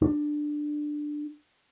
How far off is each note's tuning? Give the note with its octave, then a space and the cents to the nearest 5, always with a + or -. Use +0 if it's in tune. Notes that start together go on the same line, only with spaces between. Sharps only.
D4 +15